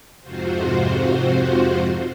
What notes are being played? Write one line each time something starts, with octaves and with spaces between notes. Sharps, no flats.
F2 G#2 C3 F4 F#4 C5